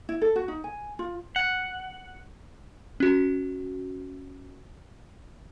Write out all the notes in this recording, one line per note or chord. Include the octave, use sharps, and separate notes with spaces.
E4
A4
F#4
D#4
G#5
F4
F#5
C#4 F#4